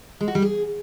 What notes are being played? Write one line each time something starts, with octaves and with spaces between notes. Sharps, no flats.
G#3
F#4
G3
G#4